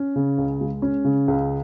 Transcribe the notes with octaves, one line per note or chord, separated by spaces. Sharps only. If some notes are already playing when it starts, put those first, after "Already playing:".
Already playing: C#4
C#3
C#2
G#3
C#4
C#3
C#2